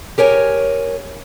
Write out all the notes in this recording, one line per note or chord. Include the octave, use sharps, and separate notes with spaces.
G4 A#4 C#5 G#5